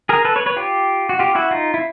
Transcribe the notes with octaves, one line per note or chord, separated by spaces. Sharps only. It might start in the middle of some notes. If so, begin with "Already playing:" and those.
G#4 A#4
A4 B4
B4 C#5
B4 C#5
F4 G4
F#4
F4 G4
E4 F#4
D#4 F4
E4